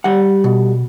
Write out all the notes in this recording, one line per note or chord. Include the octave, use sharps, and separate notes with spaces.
G3 F#5
B2